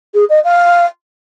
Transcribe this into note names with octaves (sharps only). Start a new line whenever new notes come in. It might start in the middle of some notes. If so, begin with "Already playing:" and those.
G#4
D#5
F5